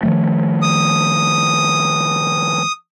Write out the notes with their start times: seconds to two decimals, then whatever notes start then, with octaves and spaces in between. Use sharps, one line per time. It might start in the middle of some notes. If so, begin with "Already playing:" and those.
0.03 D#3 F3 A3
0.62 D#6